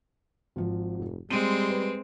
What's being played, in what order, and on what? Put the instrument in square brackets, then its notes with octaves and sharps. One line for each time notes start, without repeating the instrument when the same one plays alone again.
[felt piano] G#1 F3
[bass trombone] F1
[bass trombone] G3 [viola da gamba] G#3 C4 [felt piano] D#7
[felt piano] B4